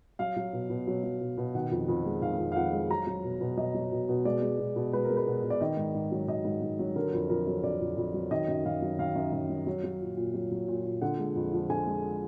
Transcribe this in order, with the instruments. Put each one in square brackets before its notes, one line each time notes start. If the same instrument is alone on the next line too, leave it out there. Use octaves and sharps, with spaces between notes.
[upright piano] F#3 F5
F#3
B2
B2
F#3
F#3
B2
B2
D#3 F#5
F2
F2
G#3
D#3 F5
F2
F5
F2 F#5
G#3
F#3 A#5
F#3
B2
B2
F#3 D#5
F#3
B2
B2
G#3 D5
G#3
B2
B2
G#3 B4
A#4
G#3
B4
B2
B2
D5
D#3 D#5
G#2
G#2
F#3
D#3 D#5
G#2
G#2
F#3
D3 A#4
F2
F2 A#4
F#3
D3 D5
F2
F2
F#3
D#3 D#5
F#2
F#2 F5
F#3
D#3 F5
F#2
F#2
F#3
F#3
F#3
A#2
A#2
F#3
F#3
A#2
A#2
D3 F#5
G#3
F2
F3
D3 G#5
G#3